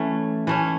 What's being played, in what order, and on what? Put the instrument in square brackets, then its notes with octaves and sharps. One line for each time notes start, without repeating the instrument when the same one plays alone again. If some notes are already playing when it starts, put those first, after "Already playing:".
Already playing: [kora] E3 A3 C#4
E3 A3 C#4